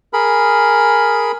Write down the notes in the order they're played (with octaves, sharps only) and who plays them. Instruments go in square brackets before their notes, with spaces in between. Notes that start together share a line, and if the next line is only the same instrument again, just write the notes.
[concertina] G#4 A#4 B5